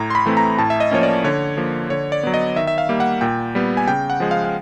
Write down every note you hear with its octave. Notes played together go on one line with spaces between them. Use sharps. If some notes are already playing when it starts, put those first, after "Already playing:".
Already playing: A2 A#5
C6
B5
E3 A3 C4
A#5
A2 A5
E5
D#5
F3 A#3 C#4 C#5
D5
D3 C#5
F3 A#3
D3 C#5
D5
F#3 B3
D#5
D#3 E5
E5
F5
G3 A#3
F#5
A#2 G5
G3 B3
G#5
C#3 G5
F#5
F3 G#3
F5
F5